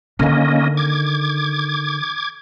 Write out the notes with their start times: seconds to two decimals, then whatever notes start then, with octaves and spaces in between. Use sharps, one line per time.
0.19 D3 D#3 A#3 C#4 D#5
0.77 D6 G#6